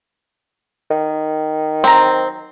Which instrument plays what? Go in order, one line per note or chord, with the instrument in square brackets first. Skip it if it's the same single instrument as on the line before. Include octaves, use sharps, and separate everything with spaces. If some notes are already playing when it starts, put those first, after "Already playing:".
[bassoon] D#3
[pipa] F#3 A#5 [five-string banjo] C4